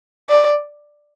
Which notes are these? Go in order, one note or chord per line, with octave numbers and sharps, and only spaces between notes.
D5